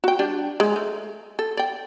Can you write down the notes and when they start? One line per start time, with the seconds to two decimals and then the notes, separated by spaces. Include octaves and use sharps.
0.04 F#4 G5
0.19 G3 D4 G4
0.60 G#3
0.76 A3
1.39 A4
1.57 D5 G5